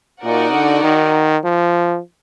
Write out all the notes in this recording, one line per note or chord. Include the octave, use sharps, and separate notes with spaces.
A#2 D#4 F#4 A#4 D5 F#5
D3
D#3
F3